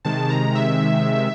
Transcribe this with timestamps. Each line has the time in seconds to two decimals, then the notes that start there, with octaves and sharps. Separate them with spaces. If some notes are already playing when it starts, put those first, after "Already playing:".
0.05 C3 D#3 G#3 A5
0.30 A#5
0.55 E5